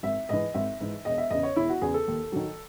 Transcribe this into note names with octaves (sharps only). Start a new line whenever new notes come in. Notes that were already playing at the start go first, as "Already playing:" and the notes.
G#1 E5
G#2 E3 D#5
G#1 E5
G#2 E3
E1 D#5
E5
E2 C#3 D#5
C#5
E1 E4
F#4
E2 C#3 G#4
A4
D#2
D#3 F#3